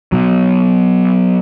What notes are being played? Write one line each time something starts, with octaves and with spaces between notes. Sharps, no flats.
B2 F#3